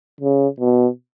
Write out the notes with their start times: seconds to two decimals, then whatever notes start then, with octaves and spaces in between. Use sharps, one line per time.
0.21 C#3
0.60 B2